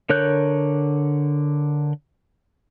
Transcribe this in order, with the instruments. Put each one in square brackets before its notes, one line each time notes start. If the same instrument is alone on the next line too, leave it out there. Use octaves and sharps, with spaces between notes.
[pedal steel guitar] D3 A#4 C#5 F#6 G6